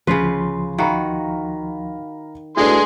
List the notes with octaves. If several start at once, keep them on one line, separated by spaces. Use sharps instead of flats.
D2 C#3 F3 C#4 F4 B4 C6
D#3 F#4 F5 A#5 B5
A3 D4 E4 F#4 G#4 B4 C6